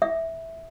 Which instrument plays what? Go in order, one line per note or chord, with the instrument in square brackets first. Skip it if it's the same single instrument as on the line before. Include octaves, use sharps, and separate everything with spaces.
[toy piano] E5